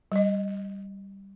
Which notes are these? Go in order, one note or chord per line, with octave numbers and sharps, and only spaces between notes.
G3 D#5